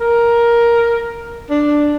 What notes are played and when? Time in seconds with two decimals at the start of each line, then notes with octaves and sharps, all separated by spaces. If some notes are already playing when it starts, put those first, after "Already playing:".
0.01 A#4
1.50 D4